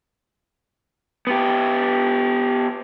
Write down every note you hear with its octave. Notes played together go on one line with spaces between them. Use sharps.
B3 G4